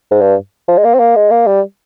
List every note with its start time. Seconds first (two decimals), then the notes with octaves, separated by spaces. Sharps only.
0.12 G#2
0.21 G2
0.68 F3
0.78 G#3
0.85 A#3
0.94 C4
1.00 A#3
1.16 G#3
1.31 A#3
1.47 G3